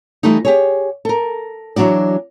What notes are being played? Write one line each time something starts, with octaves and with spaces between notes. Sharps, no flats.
E3 G3 A3 D#4
G4 G#4 C#5
A4 A#4
E3 F#3 D4 F#4 D5